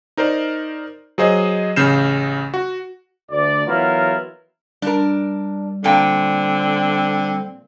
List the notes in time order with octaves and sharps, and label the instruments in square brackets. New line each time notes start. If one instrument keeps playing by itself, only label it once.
[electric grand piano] D#4 A#4 C5 D5
F#3 G#4 C5 D#5
A1 C#3 F6 G6 C7 E7
F#4
[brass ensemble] D2 D5
E3 F#3 B3 E4 F4 A#4
[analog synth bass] G3 [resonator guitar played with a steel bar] D4 A#4
[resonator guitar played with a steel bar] A#2 G5 [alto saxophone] D3 [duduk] C4